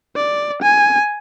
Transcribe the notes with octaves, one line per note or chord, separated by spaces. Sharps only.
D5
G#5